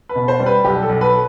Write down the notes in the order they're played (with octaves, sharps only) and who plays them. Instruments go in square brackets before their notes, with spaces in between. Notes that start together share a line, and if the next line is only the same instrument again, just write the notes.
[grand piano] B4
B2
C5
G3
B4
B1 G4
A4
B1
B4